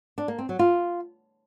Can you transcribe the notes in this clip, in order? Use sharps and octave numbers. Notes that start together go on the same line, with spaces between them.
D4
A#3
C4
F#3
F4